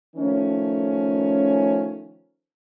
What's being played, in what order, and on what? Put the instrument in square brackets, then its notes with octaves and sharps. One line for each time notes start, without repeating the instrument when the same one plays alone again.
[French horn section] D#3 F3 A3 C#4